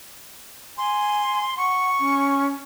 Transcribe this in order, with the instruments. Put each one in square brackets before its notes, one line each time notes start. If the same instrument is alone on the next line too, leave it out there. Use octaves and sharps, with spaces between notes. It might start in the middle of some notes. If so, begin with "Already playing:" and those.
[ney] G#5 [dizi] C6
[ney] F#5 [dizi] C#6
[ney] C#4